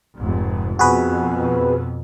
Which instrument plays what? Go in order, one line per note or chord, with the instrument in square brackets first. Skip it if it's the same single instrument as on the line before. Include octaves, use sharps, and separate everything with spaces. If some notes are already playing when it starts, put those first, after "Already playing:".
[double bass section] F1 G#2
[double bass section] F2 B2 [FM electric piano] F#4 G#4 B4